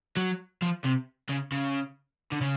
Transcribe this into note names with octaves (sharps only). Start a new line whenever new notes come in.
F#3
F3
C3
C#3
C#3
D3
C#3